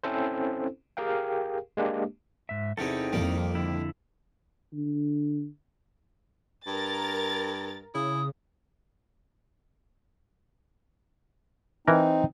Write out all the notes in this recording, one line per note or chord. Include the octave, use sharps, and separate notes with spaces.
C4 C#4 E4 A4 C5
G4 G#4 A#4 F5 G5
G#3 A#3 D4 G4
G#2 E5
E2 C3 C4 D#4 E4 A4
F2 D#3 G3 A#3
D3 E4
D3
G2 A#4 A6
C#3 E4 D#6
E3 C4 D#4 A#4